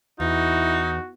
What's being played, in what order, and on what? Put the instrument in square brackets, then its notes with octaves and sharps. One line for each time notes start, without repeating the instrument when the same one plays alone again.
[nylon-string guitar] E2 [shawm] D#4 [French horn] E4 [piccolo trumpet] F#4